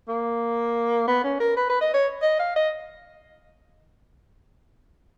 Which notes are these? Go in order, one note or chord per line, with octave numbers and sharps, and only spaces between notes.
A#3
B3
C#4
A#4
B4
B4
D#5
C#5
D#5
F5
D#5